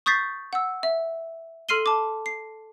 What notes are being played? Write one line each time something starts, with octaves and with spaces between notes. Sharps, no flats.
C#6 D#6 G6 A6 B6 C7
F#5 E6
E5
A4 C6 F6 C7 D#7 G7
A5 D6
C7